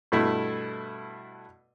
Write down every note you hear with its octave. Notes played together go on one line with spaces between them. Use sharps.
G2 B2 A3 E4